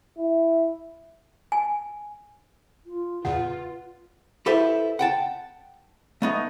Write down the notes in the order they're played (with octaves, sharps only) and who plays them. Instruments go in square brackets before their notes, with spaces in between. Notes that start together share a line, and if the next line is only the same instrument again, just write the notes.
[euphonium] E4
[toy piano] G#5
[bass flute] F4
[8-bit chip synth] E2 A#2 C#3 [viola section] F4 [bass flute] B4 [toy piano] F#5
[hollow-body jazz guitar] E4 G4 A4 B4 C5 E5
F#5 G5 A5
A3 B3 D#4